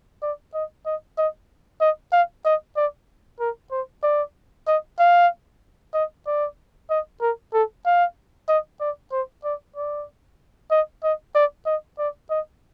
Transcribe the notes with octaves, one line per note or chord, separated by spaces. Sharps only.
D5
D#5
D#5
D#5
D#5
F5
D#5
D5
A#4
C5
D5
D#5
F5
D#5
D5
D#5
A#4
A4
F5
D#5
D5
C5
D5
D5
D#5
D#5
D5
D#5
D5
D#5